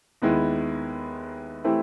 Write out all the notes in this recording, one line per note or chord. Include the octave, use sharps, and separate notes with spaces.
D#2 D#3 G#3 B3 E4
E3 A3 C4 E4 G4